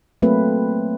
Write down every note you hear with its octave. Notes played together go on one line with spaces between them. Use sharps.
F#3 A3 A#3 C4 B4